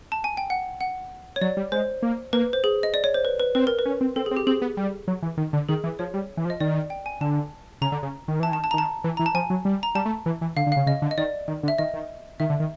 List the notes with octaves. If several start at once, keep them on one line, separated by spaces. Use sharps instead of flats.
A5
G#5
G5
F#5
F#5
C#5
F#3 D5
G3
G#3 C5
A#3
A#3 B4
C5
G#4
D#5
D5
C#5
C5
B4
B4
C4 B4
A#4
B4
C#4
C4
C4 A4
G#4
C4
G4
C4 G#4
B3
G3
F#3
E3
D#3
D3
D#3 G#4
E3
F3 C#5
G3
E3
F3
D#5
D#3 D5
G5
G#5
D3 A5
C#3 A#5
D3
C#3
D#3
E3 A5
D#3 A5
A5
A#5
D#3
A5
E3
E3 A#5
A5
F3 G#5
F#3
G3
A#5
G3 A5
A3
E3
E3
D3 F5
D3
C#3 F5
C#3 D#5
D3
D#5
D#3 D5
D#3
D3
E5
D#3 D#5
D#3
D#3 E5
D3
D#3